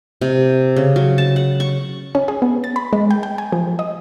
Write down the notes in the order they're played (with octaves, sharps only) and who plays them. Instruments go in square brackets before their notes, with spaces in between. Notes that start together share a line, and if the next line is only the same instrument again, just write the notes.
[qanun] C3
C#3
F#3
A5
F#5
C#6
[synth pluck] C#4
G#4
B3
A6
B5
G#3
G5
G5
G#5
F3
D#5